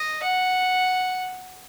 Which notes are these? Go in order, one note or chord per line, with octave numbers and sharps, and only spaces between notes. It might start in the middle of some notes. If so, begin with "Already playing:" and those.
Already playing: D#5
F#5